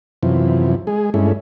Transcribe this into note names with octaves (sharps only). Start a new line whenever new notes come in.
F#2 C3 E3 F3
G#3 G#4
G2 G#3 A3 C#4 E4